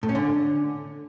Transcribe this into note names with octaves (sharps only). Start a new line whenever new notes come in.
A2
C#4
D3